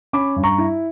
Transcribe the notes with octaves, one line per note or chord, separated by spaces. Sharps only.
C#4 B5 D6
G2
A#5 C#6
E4